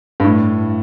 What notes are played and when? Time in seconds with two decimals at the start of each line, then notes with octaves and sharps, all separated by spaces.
0.20 G2
0.24 A2